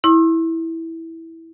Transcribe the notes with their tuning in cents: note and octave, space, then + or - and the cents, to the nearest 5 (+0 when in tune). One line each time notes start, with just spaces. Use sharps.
E4 -10 C6 +45 D#6 +0